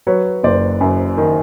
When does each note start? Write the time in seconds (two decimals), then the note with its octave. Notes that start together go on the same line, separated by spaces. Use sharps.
0.07 F#3 B4 C#5
0.43 F#1 C5 D5
0.81 F#2
1.17 D#3